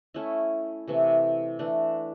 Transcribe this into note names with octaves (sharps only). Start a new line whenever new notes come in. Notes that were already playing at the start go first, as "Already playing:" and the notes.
A3 C#4 E4
C3 E3 A3
E3 A3 D4